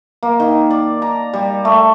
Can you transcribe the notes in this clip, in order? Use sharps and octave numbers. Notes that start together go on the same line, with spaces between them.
A#3
D#3
D5
A#5
G3
A3